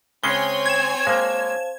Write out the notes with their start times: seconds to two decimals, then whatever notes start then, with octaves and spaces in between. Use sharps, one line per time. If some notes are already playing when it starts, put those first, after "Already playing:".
0.23 C#3 G#3 C4 C#4 C#5 G#5 C7 G7
0.66 G#6 E7
1.07 G#3 A#3 C5 F5 A5